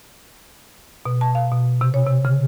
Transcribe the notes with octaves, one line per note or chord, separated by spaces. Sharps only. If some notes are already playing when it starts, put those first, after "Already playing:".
B2
A5
F5
B2
C3
C#5
C3
C#3